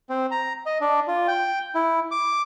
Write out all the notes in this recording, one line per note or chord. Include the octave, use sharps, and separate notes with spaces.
C4
A#5
D#5
D4
F4
G5
E4
D6